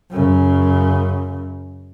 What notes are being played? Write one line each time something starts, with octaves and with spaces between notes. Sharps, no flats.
F#2 C#3